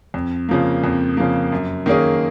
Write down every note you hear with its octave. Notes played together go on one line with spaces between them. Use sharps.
F2
C#3 F3 A#3
F2
C#3 F3 A#3
F#2
D#3 A#3 C#4 G#4